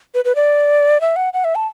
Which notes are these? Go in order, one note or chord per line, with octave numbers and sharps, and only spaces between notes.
B4
B4
D5
E5
F#5
F#5
E5
A5